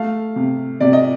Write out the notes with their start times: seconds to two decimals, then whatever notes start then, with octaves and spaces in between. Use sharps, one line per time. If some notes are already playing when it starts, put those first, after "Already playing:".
Already playing: A3 F5
0.36 C3
0.80 C3 D5
0.93 D#5